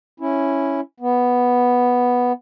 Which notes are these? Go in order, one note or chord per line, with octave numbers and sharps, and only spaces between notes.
C#4 E4
B3